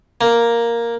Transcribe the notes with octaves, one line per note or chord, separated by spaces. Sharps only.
A#3